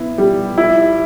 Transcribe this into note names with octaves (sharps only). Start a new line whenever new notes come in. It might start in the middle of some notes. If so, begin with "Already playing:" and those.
Already playing: B3 E4
G3
E4